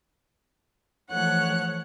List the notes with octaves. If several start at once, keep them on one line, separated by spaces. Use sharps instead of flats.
E3 F3 A3 C#5 F#5 F#6